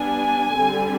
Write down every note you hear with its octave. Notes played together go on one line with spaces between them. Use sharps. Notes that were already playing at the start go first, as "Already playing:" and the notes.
Already playing: G3 B3 D4 G#5
D3 G3 C4